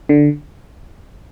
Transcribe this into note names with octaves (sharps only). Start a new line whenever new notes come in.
D3